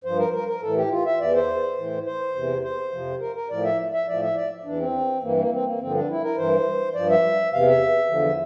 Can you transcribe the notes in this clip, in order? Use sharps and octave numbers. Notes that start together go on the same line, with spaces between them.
G2 F3 C5
A#4
A#4
A#4
A2 E3 A4
G4
F4
E5
E2 E3 D5
C5
A2 E3
C5
E2 C3 E3
C5
F2 C3 F3
A#4
A#4
A2 F3 D5
E5
E5
A2 F3 D5
E5
D5
E2 E3 D4
C4
G2 E3 A#3
A#3
C4
A#3
G2 D3 F3 C4
D4
E4
A#4
G2 E3 C5
G2 F3 D5
E5
E2 C3 E3 F5
E5
E2 D3 F3